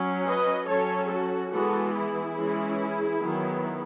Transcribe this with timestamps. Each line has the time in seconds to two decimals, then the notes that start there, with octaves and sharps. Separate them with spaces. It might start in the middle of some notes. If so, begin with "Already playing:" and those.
Already playing: F#3 C#4
0.25 B4 D#5
0.68 F#3 C#4 A4 C#5
1.10 F#4 A4
1.52 E3 G#3 B3 F#4 A4
1.94 E4 G#4
2.36 E3 G#3 C#4
3.21 D#3 F#3 B3